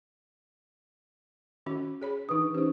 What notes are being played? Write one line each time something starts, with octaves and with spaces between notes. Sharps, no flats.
D#3 C#4 F#4
G#4 C#5 B5
E3 D4 D#4 B4 D#6
C#4 D#4 G4 C5